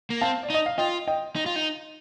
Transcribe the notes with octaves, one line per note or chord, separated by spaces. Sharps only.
A#3
C4 F5 A5
D5
D#4
D#5
F5
F4 D#5 G5
D#5 G5
D#4
F4
D#4